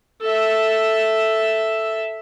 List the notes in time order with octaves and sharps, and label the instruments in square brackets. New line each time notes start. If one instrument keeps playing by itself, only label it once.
[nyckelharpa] A4 E5